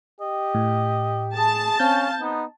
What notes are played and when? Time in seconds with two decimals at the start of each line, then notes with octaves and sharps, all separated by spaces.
0.21 G4 D#5
0.55 A2
1.36 G#4 A5
1.80 C4 C#4 F5 G6
2.20 B3 D#4